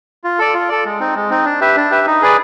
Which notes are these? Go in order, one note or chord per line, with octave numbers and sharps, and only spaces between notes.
F4
A4 D5
F4
A4 D5
G#3
C4 D#4
G#3
C4 D#4
D4
G4 B4 E5
D4
G4 B4 E5
D#4
G#4 B4 D5